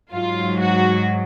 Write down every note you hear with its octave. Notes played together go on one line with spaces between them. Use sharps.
G#2 F#3 F4
F#4